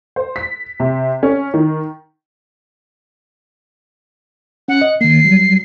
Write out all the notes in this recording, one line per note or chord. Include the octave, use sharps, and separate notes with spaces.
C5
B6
C3
C#4
D#3
C#4 F#5
D#5
D#3 A#3 C7
F#3 G3